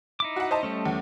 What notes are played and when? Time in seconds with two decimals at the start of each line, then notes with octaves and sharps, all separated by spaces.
0.20 D#4 E4 D6
0.36 F#4 F#5
0.51 C5 D#5 A5
0.63 G3 A3 C#4
0.86 E2